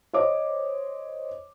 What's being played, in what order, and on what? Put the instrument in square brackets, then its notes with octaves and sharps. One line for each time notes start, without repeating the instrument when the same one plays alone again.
[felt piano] C5 C#5 D#5 D6